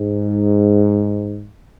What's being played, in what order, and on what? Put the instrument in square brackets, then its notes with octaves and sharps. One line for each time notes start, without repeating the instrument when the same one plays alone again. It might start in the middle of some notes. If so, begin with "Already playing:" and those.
Already playing: [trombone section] G#2